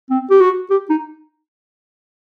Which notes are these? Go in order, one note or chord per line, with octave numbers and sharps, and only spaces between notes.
C4
G4
F#4
G4
D#4